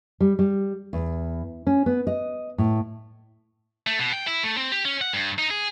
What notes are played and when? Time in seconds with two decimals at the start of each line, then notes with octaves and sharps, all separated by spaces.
0.20 G3
0.39 G3
0.93 E2
1.67 C#4
1.86 B3
2.07 D#5
2.58 A2
3.87 A3
3.99 B2
4.13 G5
4.27 E4
4.44 A3
4.57 C4
4.72 G4
4.85 C#4
5.01 F#5
5.13 G2
5.38 D#4
5.50 G#4